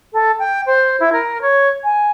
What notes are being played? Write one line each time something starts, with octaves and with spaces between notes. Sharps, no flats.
A4
G5
C5
E4
A#4
C#5
G#5